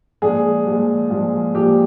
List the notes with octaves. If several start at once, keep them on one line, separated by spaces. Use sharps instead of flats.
A#2 F3 G#3 D4 G#4
A#2 F3 G#3 D4
A#2 F3 G#3 D4
A#2 F3 G#3 D4 G4